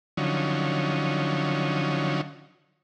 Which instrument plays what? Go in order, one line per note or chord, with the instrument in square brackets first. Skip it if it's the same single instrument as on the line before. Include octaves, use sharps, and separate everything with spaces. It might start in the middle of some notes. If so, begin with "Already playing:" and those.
[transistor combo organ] D3 F3 F#3 C#4 D#4